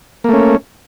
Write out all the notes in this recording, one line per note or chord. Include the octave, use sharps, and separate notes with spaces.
A3 A#3 C#4